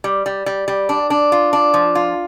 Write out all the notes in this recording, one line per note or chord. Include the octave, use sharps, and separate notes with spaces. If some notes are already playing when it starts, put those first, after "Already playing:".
G3
G3
G3
G3
D4
D4
F4
D4
F3
F4